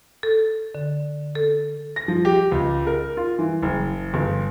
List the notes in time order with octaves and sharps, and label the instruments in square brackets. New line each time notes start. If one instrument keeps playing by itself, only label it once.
[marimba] A4
D3
A4
[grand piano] A#6
F3
G4
C#2
A#4
F4
E3
F#1
G1